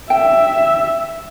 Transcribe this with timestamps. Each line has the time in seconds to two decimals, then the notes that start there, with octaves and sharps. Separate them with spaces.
0.10 E5 G5